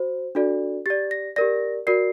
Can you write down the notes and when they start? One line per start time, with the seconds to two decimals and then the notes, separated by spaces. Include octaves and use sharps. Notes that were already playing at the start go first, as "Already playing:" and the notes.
Already playing: F#4 C5
0.35 D4 F#4 A4 D5
0.86 G4 D5 A6
1.11 A#6
1.36 G4 A#4 D5 A#6
1.87 F#4 A#4 D5 C7